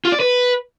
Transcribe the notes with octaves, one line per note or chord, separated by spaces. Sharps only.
F4
D5
B4